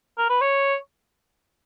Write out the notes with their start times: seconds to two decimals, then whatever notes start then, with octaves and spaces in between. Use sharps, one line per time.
0.18 A#4
0.30 B4
0.41 C#5